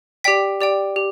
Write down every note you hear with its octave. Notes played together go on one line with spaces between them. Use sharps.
G4 D5 G5 B6
G4 D5 G5
G4